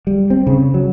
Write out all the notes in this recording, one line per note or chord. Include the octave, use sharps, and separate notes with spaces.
G3
C4
C#3
F#3